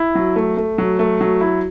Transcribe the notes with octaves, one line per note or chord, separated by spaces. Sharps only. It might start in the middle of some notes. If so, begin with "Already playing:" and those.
Already playing: E4
F#3
A3
A3
F#3
A3
F#3
E4